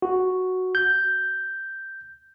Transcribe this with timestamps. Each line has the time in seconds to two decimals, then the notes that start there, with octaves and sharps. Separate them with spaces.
0.02 F#4
0.75 G6